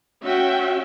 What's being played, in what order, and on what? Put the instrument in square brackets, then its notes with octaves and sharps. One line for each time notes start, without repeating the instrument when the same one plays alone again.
[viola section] C#4 F#4 E5 G5